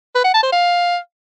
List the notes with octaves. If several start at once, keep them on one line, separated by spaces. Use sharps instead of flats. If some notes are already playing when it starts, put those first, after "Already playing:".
B4
F#5
A5
C5
F5